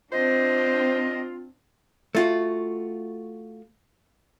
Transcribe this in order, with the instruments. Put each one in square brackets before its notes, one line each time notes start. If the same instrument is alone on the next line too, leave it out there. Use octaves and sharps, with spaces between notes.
[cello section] C4 D4 [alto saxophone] F4 [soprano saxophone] C5 [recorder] D#5
[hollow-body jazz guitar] A3 F4 F#4